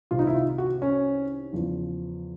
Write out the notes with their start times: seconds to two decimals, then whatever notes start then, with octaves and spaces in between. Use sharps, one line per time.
0.11 C2 C3 D#3 F4
0.19 D#4
0.27 E4
0.35 F4
0.58 F#4
0.82 C#4
1.53 E2 C#3 F3